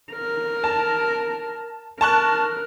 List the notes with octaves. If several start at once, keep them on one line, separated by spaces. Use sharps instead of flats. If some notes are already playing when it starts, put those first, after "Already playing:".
A#4
A5
A#4 A5 C#6 F#6